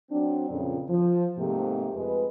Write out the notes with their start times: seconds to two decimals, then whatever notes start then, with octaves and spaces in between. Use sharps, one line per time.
0.10 F#3 C4 D4
0.50 F2 A#2 C#3
0.88 F3
1.37 G#2 C3 A3 A#3 G4
1.95 F2 G#3 B4